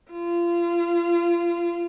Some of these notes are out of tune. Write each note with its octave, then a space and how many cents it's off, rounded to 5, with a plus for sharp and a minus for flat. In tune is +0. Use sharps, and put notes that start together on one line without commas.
F4 -30